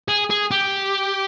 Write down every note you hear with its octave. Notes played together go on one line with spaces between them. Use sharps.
G#4
G#4
G4